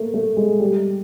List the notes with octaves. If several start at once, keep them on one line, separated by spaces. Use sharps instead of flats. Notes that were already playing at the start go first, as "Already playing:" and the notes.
Already playing: A3 A#3
A3
G#3
G3